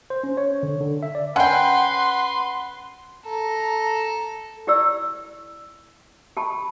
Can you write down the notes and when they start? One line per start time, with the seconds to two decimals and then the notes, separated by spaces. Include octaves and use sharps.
0.10 C5
0.24 C#4
0.37 C#5
0.63 D3
0.81 D3
1.03 E5
1.15 D5
1.36 C#4 B4 F#5 G5 C6
3.26 A4 A#5
4.67 E4 G4 D5 E6
6.37 G4 A5 B5